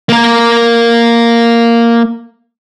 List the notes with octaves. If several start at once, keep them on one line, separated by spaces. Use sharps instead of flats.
A#3 A#4